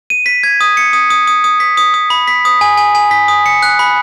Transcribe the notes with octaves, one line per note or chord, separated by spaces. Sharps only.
D#7
B6
G#6
D#6
C#7
D#6
D#6
D#6
D#6
B6
D#6
D#6
B5
B6
D#6
G#5
G#5
G#5
B6
D#6
C#7
F#6
B5